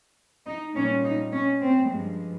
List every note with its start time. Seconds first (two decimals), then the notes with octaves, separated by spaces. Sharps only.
0.46 D#4
0.75 A#2 G3 A#3 C#4
1.04 D#4
1.32 C#4
1.61 C4
1.89 G2 F3 G#3